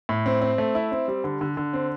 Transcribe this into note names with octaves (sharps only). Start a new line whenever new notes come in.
A2
C4
C4
A3
E4
C4
G3
D3
D3
D3
C4